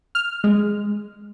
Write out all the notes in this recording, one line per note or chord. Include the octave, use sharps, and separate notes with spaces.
F6
G#3